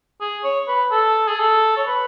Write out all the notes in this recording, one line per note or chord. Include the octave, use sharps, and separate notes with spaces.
G#4
C#5
B4
A4
G#4
A4
C#5
B4